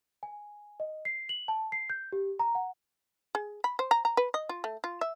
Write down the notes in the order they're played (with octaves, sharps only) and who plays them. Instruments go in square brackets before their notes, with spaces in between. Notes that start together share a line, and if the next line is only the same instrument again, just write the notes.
[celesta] G#5
D#5
C7
F#7
A5
C7
G6
G4
A#5
F#5
[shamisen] G#4
B5
C5
A#5
A#5
B4
D#5
F4
A3
F4
E5